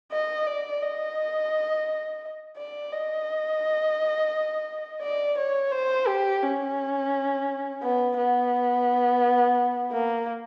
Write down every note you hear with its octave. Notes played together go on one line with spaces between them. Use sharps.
D#5
D5
D#5
D5
D#5
D5
C#5
C5
G4
C#4
B3
B3
A#3